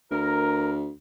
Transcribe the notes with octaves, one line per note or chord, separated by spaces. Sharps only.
D2 A#4